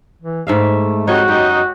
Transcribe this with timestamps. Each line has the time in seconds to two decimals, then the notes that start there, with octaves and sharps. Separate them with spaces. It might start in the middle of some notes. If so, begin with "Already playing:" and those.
0.22 E3
0.47 G#2 A3 E5 F5
1.08 F2 G3 D#4 F#4 C#5
1.28 F#2 D#4 G4